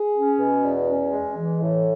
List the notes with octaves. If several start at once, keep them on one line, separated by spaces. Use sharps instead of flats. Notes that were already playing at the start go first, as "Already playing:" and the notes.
Already playing: G#4
C#4
B2
E2
C#4
G#3
E3
A2